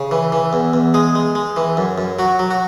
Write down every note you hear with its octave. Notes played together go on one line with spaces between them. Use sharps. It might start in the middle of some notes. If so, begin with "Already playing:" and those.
Already playing: C#3
E3
E3
E2
E2
G#3 G#4
G#3
G#3
E3
F#2
F#2
F#3 F#4
F#3
F#4